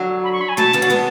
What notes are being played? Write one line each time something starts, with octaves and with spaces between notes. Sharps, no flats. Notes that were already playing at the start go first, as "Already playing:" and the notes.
Already playing: D3 F#3
B5
C#6
B5
G#5
F#3 A3 A5
C#3 E3
D3 F#3
G#3 B3